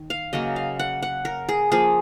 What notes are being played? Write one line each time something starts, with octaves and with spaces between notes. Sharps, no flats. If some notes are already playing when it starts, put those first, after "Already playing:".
Already playing: D#3
F5
C#3 F#3 A#3 D#5
F5
F#5
F#5
A#4
G#4
F3 A#3 G#4